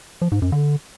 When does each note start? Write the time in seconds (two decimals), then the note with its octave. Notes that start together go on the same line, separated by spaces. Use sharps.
0.22 F3
0.32 G#2
0.42 F#2
0.52 D3